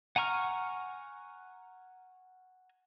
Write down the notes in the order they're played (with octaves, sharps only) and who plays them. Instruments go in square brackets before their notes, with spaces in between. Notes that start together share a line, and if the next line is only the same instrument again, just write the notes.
[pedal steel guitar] F#5 G#5 A#5 C#6 F6